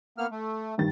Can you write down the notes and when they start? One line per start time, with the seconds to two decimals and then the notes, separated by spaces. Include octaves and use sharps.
0.18 A#3 B3 F6
0.31 A3
0.78 G2 D#3 A6